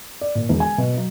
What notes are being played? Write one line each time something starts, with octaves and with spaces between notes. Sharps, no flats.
D5
A#2
E1
G#5
B2
F#3